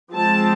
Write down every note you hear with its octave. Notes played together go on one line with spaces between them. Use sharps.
F3 G#3 C4 A5